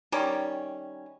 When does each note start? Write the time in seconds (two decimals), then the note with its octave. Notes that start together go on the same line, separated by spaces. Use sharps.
0.12 D#3 G3 C#4